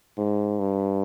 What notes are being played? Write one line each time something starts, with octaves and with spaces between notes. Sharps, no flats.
G#2
G2